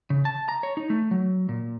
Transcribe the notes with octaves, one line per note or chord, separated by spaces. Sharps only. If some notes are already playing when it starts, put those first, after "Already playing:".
C#3
A5
A#5
C#5
D#4
A3
F#3
A#2